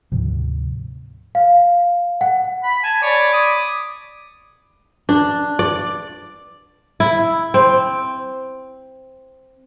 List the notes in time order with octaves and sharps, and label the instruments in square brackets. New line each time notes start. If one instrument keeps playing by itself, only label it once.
[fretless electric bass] D2 G#2 C3 F3
[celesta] F5
F#5
[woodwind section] B5
[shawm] G#5 [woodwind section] A5
[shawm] C#5 [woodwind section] D5 B5 D6
[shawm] D#6
[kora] D4
D5
E4
C4